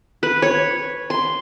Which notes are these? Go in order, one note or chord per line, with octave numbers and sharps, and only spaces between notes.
B4
C#5
C6